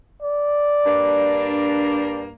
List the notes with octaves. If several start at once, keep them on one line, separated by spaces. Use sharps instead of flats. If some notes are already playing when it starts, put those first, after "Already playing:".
D5
G2 A#3 D4